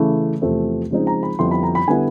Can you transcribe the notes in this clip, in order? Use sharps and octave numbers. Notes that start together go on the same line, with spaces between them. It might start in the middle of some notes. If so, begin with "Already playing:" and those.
Already playing: C#3 E3 A3
E2 C3 F3 A3 C4
C#3 F3 G#3 C4 D#4
A#5
B5
F2 D3 G3 B3 E4 C6
B5
A#5
B5
D3 G3 B3 E4 G#5